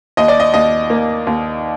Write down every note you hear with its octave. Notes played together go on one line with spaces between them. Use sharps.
D#2 D#5
D5
D#5
D#2 D#5
A#3
D#2